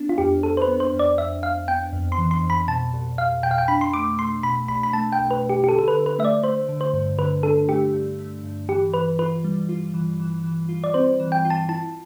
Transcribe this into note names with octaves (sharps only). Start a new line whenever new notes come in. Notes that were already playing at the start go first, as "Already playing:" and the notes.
Already playing: B3 D4
F4
F2 G4
F2 A4
C5
B4
B3
C5
F2
D5
F2 E5
F2 F5
B3 G5
F2
C6
E3
C6
F2
B5
B2 A5
C2
C2 F5
B2 G5
F5
G5
D4 B5
C6
A3 D6
A3 C6
B2 B5
C2 B5
B5
A3 A5
G5
C2
B4
C2
G4
G4
D3 A4
A4
B4
D3
B4
A3 E5
D5
A3 C5
D3
C5
G2
D3 B4
D4 A4
A3 G4
G2
A3
G2
E3 G4
E3 B4
F4 B4
G3
F4
E3
E3
E3
F4
D5
C4 C5
E3
G5
F4
A5
E4 A5